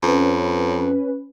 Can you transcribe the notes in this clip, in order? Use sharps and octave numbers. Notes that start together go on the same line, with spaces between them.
F2 C#4 B4